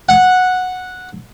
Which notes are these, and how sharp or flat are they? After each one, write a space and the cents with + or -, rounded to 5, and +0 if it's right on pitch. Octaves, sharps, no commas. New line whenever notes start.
F#5 -10